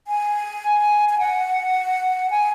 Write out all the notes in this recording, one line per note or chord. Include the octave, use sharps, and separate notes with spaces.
G#5
G#5
F#5
G#5